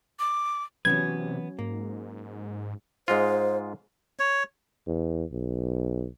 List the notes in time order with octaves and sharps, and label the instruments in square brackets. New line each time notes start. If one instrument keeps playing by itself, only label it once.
[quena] D6
[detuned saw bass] C3 [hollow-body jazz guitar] E3 B3 B4 [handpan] F#3 C#4 [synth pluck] G#6
[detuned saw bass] G#2 [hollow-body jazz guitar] A#3
[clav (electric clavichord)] G#2 G#3 F4 [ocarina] C5
[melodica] C#5
[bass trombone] E2
B1